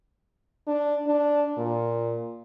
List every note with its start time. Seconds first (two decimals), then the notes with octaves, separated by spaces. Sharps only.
0.67 D4
1.06 D4
1.58 A#2